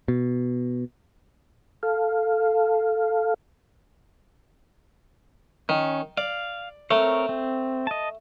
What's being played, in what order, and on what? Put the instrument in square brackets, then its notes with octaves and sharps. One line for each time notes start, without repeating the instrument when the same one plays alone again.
[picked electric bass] B2
[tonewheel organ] A4 F5
[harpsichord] D#3 [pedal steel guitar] C#4
[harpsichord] D5 [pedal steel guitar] F5
[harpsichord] A3 [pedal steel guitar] C4 A#4 C#5
[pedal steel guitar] C4
D#5 A5